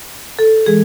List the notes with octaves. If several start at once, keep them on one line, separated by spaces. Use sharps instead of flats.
A4
E3 G#3 G#4